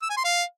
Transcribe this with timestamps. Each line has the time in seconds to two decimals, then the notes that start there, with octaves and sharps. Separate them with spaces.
0.02 E6
0.10 G#5
0.17 C6
0.24 F5